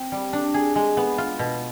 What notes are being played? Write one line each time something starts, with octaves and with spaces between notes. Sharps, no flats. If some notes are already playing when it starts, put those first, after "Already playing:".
Already playing: C4
G3
D4
G#4
G#3
B3
F4
B2